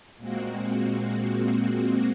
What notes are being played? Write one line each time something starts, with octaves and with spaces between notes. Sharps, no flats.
A#2 G#3 A#3 C4 F#4